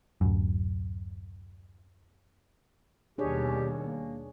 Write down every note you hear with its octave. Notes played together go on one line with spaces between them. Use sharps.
D1 F#2
D#2 B2 G3 D4 G4 G#4 C#5
A#3